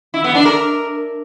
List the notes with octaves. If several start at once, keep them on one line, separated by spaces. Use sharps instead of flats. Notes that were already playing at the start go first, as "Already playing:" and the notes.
E4
B3
D4
A#4